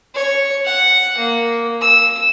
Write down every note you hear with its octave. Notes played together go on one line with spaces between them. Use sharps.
C#5
F#5
A#3
E6